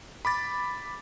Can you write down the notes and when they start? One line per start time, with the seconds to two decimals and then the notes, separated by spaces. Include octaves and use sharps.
0.25 B5 D6 A6